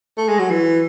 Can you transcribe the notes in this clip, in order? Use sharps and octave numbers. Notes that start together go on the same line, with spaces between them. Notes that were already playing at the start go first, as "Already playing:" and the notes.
A3
G#3
F#3
E3